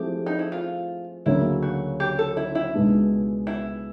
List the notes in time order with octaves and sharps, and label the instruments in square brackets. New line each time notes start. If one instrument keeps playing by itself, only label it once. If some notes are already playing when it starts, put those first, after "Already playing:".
Already playing: [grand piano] F3 A3 C4 E4 G#4 [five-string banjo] G4
[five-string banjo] D#4
E4
F4
[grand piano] D2 C#3 F#3 A#3 C#4 [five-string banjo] E4
[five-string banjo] F#4
G4
A4
E4
E4
[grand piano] C#2 B2 G#3 B3 D4
[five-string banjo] E4